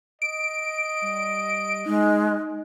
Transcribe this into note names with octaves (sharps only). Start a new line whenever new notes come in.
D#5 D7
G3
G#3 D#4